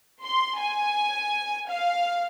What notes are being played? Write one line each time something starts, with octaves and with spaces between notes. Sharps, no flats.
C6
G#5
F5